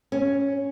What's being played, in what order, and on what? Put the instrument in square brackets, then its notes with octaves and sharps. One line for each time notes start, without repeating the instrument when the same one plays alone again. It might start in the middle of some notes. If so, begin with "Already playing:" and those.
[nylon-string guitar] C#4